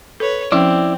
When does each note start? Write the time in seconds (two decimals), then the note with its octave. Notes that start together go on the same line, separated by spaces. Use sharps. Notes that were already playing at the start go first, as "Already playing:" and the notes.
0.20 A4 B4 C#5
0.52 F3 C4 C#4 E4 D5